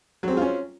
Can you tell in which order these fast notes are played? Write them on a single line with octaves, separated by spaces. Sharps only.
F#3 C4 G#3 F4 C#4